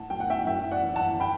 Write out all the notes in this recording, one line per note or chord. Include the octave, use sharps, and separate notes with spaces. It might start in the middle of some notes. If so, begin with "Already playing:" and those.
Already playing: A2 F#5 A5
F#3 G5
F#5
E5 G5
F#2 E5 G5
D5 F#5
E3
F#5 A5
G5 B5